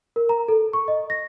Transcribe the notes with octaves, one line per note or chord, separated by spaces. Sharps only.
A#4
A#5
A4
C#6
D#5
A#6